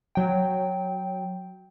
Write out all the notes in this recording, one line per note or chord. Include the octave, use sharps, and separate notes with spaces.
F#3 G5